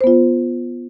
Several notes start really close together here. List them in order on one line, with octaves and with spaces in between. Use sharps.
C5 B3 F4